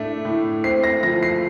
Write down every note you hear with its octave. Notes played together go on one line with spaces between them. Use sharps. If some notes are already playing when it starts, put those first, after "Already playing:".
Already playing: A2 A3 D4
A2
C4 C7
A#6
F3 A#6
C7